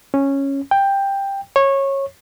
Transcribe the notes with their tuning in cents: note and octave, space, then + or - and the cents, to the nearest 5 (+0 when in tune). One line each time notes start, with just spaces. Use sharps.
C#4 -10
G5 +10
C#5 -20